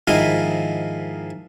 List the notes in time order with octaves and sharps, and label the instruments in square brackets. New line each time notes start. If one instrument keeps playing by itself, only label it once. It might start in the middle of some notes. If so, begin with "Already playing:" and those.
[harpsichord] G#2 D#3 F3 E4 D#5